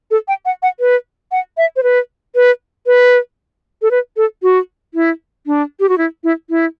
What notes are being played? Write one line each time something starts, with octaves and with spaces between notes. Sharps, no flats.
A4
G5
F#5
F#5
B4
F#5
E5
C5
B4
B4
B4
A4
B4
A4
F#4
E4
D4
G4
F#4
E4
E4
E4